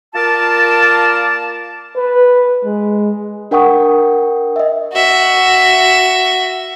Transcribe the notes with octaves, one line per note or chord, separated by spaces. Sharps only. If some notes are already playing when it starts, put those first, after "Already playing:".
A#3 F4 A#4 D5 A5
B4
G#3
D4 A#4 F#5 G5 C#6 D#6
D#5 E5
F#4 E5